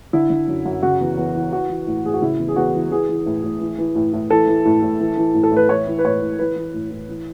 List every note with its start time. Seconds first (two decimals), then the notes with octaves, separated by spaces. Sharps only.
0.13 D3 E4
0.30 D3
0.48 F#2
0.65 F#2
0.83 C#3 F#4
1.01 E2
1.17 E2
1.35 E3
1.52 E3 F#4
1.69 E3
1.87 A2
2.04 A2 G#4
2.14 F#4
2.22 C#3 E4
2.39 E2
2.48 G#4
2.56 E2 F#4
2.74 E3
2.91 E3 G#4
3.09 E3
3.26 A2
3.44 A2
3.61 E3
3.78 E3
3.96 A2
4.13 A2
4.30 E3 A4
4.47 E3
4.65 A2
4.82 A2
5.00 E3
5.17 E3
5.34 A2
5.43 A4
5.52 A2 B4
5.69 E3 C#5
5.87 E3
5.99 B4
6.05 A2 C#5
6.22 A2
6.39 E3 B4
6.56 E3
6.74 A2
6.91 A2
7.09 E3